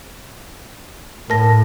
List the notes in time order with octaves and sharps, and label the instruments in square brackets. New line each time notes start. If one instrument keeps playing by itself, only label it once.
[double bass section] A2 [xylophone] A#4 A5 A#6